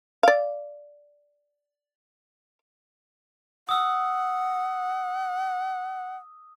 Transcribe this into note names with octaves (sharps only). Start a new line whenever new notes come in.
D5 F5
F#5 D#6 E6